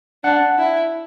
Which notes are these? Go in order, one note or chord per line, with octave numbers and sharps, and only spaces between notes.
D4 F#5
E4